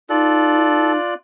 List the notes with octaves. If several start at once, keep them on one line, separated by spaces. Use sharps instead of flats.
D#4 F4 A4 D5 F#6